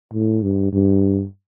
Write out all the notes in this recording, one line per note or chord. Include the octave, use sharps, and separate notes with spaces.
A2
G2
G2